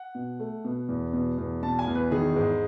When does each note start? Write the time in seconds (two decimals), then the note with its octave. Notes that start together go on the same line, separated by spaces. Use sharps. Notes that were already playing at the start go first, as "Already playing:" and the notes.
Already playing: F#5
0.15 B2
0.40 A3
0.65 B2
0.89 E2
1.13 B2
1.38 E2
1.62 B2 A5
1.79 G#5
1.88 E2
1.95 B4
2.11 D#3 G#4
2.36 G#2